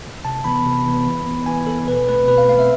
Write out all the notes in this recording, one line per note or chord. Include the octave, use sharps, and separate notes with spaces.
C3 A5
E3 B3 B5
C3
E3 B3
E3
B3
E3 G#5
B3 A4
B2 B4
A3 C4 B4
B2 B4
F5
A3 C4 F5
E5